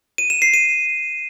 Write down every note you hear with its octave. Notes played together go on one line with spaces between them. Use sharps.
D#7
E7
C7
D#7